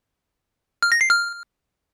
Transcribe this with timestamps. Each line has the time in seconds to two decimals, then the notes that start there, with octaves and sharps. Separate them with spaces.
0.82 F6
0.92 A#6
1.01 C7
1.10 F6